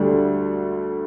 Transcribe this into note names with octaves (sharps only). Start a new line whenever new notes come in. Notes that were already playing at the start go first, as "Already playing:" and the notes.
Already playing: D2 D3 G3